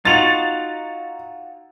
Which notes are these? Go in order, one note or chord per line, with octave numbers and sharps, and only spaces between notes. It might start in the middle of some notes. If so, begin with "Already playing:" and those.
D#4 F4 F#4 A6 F7